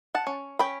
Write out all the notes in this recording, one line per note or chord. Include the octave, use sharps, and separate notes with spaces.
F#5 A5
C#4
C#4 G5 B5